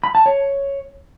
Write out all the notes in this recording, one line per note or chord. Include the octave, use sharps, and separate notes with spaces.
B5
A5
C#5